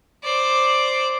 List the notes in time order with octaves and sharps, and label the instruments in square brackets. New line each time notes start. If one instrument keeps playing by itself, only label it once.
[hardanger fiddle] C5 D5